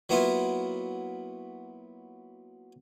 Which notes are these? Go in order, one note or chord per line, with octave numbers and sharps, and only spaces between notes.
F#3 A#3 B3 E4 F4